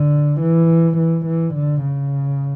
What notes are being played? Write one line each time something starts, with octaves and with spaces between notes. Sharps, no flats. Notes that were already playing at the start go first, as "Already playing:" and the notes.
Already playing: D3
E3
E3
E3
D3
C#3